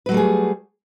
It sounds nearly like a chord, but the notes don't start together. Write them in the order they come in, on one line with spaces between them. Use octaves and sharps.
B4 F#3 A3 G3 G#4